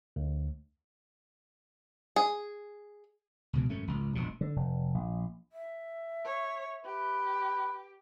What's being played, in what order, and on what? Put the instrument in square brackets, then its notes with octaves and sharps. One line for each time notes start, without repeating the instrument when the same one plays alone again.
[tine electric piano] D2
[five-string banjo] G#4
[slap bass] C#2 B2 E3
G#1 F#2 A3 C#4
G#1 C#2
E1 A#1 B2
D3
F1
A#1
[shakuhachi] E5
[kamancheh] C#5
[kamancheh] G4 [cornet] B4